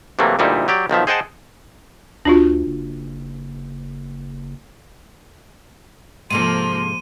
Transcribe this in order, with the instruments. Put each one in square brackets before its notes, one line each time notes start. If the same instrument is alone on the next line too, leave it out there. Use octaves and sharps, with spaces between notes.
[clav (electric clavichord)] C3 E3 F#3 A3 A#3
D2 A#2 G3 D#4 E4
F#3 G4 D5
B1 D#3 F3 E5
G#4 C5 D#5 F#5 G5 A5
[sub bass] D2 [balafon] D4 F4 F#4
[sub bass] F#1
[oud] G#2 C3 A4 [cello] F3 A#3 [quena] C6 [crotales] D#7